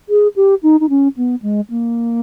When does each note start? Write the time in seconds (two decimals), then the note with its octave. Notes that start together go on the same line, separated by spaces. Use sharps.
0.09 G#4
0.36 G4
0.63 D#4
0.80 D#4
0.89 C#4
1.17 B3
1.42 G#3
1.70 A#3